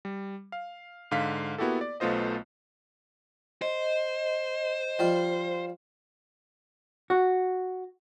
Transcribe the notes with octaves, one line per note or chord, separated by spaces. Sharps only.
G3
F5
G#2 D3 F5 B6
A#3 B3 E4 F#4 G4 A4
D5
B1 A3 B3 F4 C5 D#5
C5 D#5
F3 G3 F4
F#4